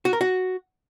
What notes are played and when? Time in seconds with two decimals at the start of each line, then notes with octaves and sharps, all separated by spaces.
0.05 F#4
0.13 A#4
0.21 F#4